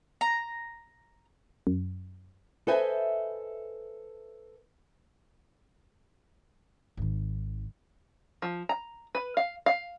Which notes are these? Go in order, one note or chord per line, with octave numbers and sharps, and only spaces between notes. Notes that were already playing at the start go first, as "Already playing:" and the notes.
A#5
F#2
A4 B4 C5 D#5 E5 G#5
G#1 D#3
F3
A#5
B4
F5
F5